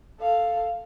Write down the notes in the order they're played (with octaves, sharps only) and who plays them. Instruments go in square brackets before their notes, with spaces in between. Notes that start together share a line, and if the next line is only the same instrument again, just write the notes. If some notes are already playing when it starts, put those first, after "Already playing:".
[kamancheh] A4 F5